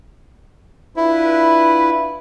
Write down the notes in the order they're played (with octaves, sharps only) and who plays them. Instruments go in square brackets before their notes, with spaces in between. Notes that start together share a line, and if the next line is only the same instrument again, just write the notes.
[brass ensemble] D4 F4 B4 [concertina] E4